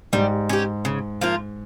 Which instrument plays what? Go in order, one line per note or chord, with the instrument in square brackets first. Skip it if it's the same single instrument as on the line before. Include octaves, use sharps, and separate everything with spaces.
[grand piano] G#2 [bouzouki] G3
[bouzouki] C#4 G4
C#3
F3 A#3 F4